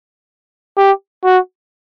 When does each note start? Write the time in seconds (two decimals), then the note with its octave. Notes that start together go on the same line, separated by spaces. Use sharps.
0.77 G4
1.24 F#4